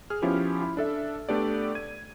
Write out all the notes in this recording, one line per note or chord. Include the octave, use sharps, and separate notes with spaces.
G#4 F6
F3 B3 C#4 E4 F4 G4
E4
D4 A4 E5
A3 B3 D4 G4 A4 D5
G#6 D#7